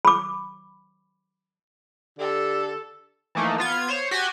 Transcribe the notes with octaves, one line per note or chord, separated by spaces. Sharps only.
B5 D6
D3 G4 A4
E3 F3 A3 A#3 D#4
B3 F4 G#6
C5 C#5
F#4 G4 G5 G#5